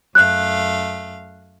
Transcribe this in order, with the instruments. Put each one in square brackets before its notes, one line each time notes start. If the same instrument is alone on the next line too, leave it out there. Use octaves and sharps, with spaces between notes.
[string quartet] F#2 A3 F5 [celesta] F#6